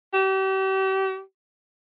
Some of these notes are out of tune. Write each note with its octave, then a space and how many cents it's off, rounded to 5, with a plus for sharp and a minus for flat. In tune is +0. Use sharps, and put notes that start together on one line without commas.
G4 -40